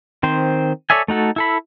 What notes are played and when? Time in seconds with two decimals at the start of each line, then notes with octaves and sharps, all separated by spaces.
0.23 D#3 C4 C5
0.90 A4 C#5 D5 E5 G#5
1.08 A3 D#4 F#4 A4
1.36 E4 A4 B5